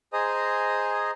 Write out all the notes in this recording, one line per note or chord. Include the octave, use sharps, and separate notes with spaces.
G#4 C5 D#5 G#5 A#5 D#6